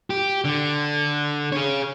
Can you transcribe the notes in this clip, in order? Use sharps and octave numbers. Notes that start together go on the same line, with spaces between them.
G4
D3
G#4 C#5